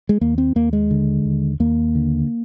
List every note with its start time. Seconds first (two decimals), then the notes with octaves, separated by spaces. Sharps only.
0.09 G#3
0.21 D#2 A#3
0.38 C4
0.55 D#2 A#3
0.73 G#3
0.91 D3
1.25 D#2
1.60 D#2 A#3
1.95 D3